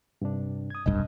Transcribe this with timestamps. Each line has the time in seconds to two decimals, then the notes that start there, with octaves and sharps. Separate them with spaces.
0.22 G2 C3 D4
0.70 D#6 G#6
0.86 F1 B1 G2 D#5